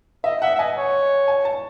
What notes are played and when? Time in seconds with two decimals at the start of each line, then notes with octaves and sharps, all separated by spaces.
0.24 D#5 E5
0.42 E5 F#5
0.55 E5
0.59 D#5 G#5
0.76 C#5
1.28 G#5
1.45 A5